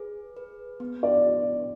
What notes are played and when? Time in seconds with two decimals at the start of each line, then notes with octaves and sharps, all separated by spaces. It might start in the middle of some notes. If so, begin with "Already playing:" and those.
Already playing: G#4 B4
0.36 B4
0.80 B3
1.03 D5